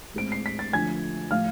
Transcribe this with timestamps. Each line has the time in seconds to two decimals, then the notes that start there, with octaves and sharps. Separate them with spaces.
0.14 A2 G#3 C4 D7
0.32 C7
0.46 B6
0.59 A6
0.73 D3 F3 A3 G#5 G#6
1.31 A2 F3 A3 F5 F6